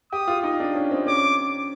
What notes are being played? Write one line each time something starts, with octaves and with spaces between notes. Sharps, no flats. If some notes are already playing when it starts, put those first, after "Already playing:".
G4 D#6
F4
D#4
D4
C#4
C4
C#4 D6